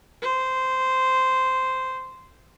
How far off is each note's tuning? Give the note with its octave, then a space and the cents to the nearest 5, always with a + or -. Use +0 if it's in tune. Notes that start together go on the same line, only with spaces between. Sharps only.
C5 -10